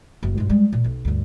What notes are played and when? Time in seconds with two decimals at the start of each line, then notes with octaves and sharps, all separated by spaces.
0.23 F#1
0.38 G2 F4
0.49 G3 G#3
0.73 A#2
0.84 B1
1.05 D2 G2